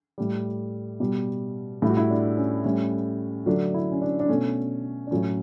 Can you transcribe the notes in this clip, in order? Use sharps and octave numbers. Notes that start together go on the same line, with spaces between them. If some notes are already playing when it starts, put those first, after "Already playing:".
A2 G3
B2 G3
A2 G3 E4
F#4
E4
D4
C#4
A2 G3 C#4
D3 F#3 A3 D4
E4
C#4
D4
D4
B2 A3 C#4
D4
A2 F#3 A3 C#4